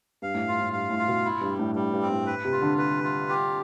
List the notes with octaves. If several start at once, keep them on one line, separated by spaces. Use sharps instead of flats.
G2 F5
A2
G2 F4
A2
G2 F5
A2
F4
B2
E4
G2
G3
A2
G2 G3
G2
C4
A2
B4
C3
F4
D3
B4
F4
G4